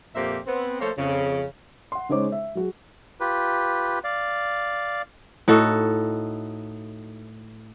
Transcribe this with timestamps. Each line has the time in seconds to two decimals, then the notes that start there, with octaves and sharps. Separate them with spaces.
0.15 F2 A#2 A#3 G4 C5 E5
0.47 B3 C4
0.80 F3 A3 A#3 A4 C5 C#5
0.97 F2 C#3
1.92 F#5 C6
2.09 C#3 G#3 D#4 C5 C#5 D6
2.32 E5
2.55 F#3 F#4 G#4
3.20 F4 G4 B4
4.04 D5 F5
5.48 A2 D#4 F#4 A4